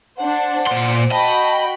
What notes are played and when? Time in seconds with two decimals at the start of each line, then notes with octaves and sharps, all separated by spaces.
0.18 D4 C5 F#5
0.67 A#2 C5 C6
1.12 F#4 D#5 G5 A5 B5